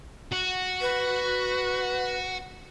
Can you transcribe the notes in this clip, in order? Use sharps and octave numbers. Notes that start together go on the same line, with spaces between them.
F#4
B4